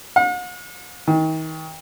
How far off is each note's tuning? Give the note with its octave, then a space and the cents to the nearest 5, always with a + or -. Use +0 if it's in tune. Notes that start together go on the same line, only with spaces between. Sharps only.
F#5 -45
D#3 +35